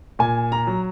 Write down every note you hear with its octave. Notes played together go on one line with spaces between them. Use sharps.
A#2 G#5
A#5
F#3